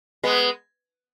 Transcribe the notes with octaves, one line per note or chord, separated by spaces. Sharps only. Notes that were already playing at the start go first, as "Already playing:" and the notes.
G#3 B3